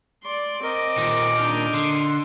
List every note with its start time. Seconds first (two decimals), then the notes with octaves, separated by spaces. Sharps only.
0.23 D5 C6
0.63 C4 A#4 D#5 D6
0.98 A#2 D#3
1.37 D4 D#4 F6 G6
1.74 D3 C6